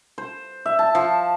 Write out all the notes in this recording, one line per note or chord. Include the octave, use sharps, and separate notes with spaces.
C5
E5
A5
F3